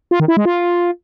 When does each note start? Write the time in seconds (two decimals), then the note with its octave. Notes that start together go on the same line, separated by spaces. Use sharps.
0.11 F4
0.20 D#3
0.28 E4
0.37 G#3
0.45 F4